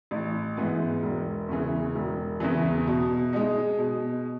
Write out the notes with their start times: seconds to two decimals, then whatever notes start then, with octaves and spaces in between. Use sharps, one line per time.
0.11 A1
0.57 G#2 E3 B3
1.03 E1
1.49 E2 C#3 E3
1.95 E1
2.40 E2 C#3 E3
2.87 B2
3.33 G#3 D#4
3.79 B2